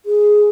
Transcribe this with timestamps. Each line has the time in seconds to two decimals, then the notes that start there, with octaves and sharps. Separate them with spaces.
0.06 G#4